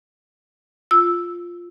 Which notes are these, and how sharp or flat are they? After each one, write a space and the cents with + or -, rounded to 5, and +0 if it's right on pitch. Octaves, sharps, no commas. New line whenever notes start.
F4 +0 E6 +0